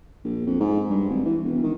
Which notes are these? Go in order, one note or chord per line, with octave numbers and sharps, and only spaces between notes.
A#1
F2
G#2
G2
G#1
E3
E1
D#3